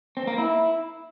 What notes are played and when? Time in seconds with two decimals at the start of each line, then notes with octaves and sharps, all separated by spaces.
0.17 C4
0.27 A#3
0.38 E4